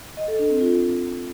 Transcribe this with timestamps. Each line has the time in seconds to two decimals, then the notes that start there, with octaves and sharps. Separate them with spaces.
0.17 D#5
0.28 A4
0.39 D4
0.50 C4
0.61 F4